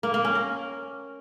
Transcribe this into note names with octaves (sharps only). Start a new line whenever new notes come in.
A#3
A#3
C#4
A#4